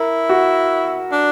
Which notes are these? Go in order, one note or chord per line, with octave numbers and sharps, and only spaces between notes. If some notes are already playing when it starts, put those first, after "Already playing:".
Already playing: E4 A#4
F#4
D4